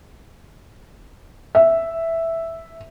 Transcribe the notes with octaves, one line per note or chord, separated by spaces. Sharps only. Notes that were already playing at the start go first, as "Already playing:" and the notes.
E5